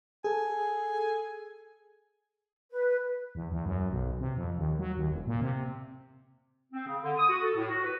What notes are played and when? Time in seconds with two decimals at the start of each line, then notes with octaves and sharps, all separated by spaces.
0.24 G#4 A4 G#5
2.71 B4
3.35 E2
3.52 E2
3.66 F#2
3.91 B1
4.19 C3
4.36 F2
4.57 D#2
4.79 F#3
4.97 D#2
5.11 E1
5.27 A#2
5.41 C3
6.72 C4
6.85 C#3
7.02 D3
7.17 D#6
7.29 F#4
7.42 A4
7.56 A2
7.68 F#4
7.84 B4